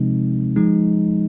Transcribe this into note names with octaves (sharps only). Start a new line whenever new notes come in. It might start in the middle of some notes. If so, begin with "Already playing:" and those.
Already playing: C3 F3 G#3 C4 D#4
F3 G#3 D#4